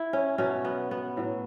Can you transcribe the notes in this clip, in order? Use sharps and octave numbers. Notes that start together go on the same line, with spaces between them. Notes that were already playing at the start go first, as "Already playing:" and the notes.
Already playing: E4
C#4
B2 F#3 C#4
B3
B3
A2 F#3